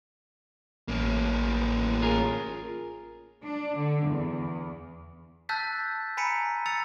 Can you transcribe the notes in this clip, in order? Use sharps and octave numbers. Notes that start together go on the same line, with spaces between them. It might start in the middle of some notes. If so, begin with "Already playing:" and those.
A1 A#3 C#4
F4 G#4 A#4
D4
D3
E2
A5 E6 F#6 G6 A6 B6
G#5 A#5 B5 B6 C#7 D#7
E6 A6 C#7 F7